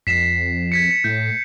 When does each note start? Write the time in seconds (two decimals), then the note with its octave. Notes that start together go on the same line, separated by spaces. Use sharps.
0.07 F2 B6 C7 E7
0.72 G#6 B6 C#7
0.91 C#7
1.04 A2 G6